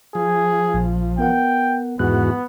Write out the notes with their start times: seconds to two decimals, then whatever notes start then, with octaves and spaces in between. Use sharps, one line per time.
0.15 F3 G#4
0.74 A#1
1.19 B3 A#4 F#5 G5
1.99 E2 G#2 B3 F#4 F#6